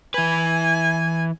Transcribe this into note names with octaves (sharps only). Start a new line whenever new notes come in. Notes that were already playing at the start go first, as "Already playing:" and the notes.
E3 B4 G#5